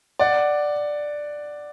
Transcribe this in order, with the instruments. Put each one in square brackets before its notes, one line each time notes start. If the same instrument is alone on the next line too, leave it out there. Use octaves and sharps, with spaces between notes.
[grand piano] D5 F#5